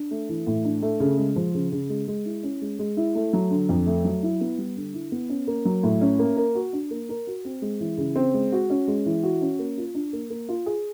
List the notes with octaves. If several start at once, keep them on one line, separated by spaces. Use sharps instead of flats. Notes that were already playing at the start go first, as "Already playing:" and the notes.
Already playing: D4
A3
E3
A2
D4
A3
C#3
G#3
F3
C#3
C#3
G#3
G#3
E4
C#4
G#3
G#3
E4
A3
F#3
D3
F2
A3
F#3
E4
B3
G3
D3
E4
B3
C#4
A#3
F#3
A2
C#4
A#3
A#4
F#4
D4
A#3
A#4
F#4
C4
G#3
E3
C#3
C4
G#3
F#4
C#4
G#3
E3
F#4
C#4
A#3
F4
D4
A#3
A#3
F4
G#4